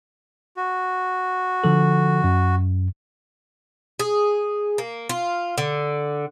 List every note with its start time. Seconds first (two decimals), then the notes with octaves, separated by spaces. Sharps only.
0.57 F#4
1.64 D3 F3 A4
2.24 F#2
4.00 G#4
4.78 A#3
5.09 F4
5.58 D3